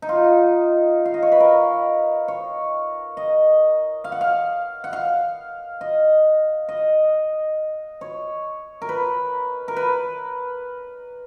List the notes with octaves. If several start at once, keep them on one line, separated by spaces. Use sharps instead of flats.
D#4
F4
F5
D#5
C#5
B4
A#4
C#5
D#5
F5
F#5
F5
F#5
F5
D#5
D#5
C#5
A#4
B4
A#4
B4